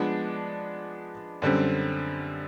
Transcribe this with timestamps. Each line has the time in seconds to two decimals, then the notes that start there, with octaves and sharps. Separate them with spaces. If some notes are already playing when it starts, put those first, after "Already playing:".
Already playing: F3 G#3 B3 D4
1.42 F#2 D3 G3 C4